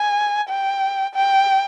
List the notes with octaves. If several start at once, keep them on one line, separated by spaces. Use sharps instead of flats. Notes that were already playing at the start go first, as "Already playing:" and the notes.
Already playing: G#5
G5
G5